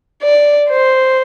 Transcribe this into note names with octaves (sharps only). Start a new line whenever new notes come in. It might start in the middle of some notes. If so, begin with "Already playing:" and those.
D5
C5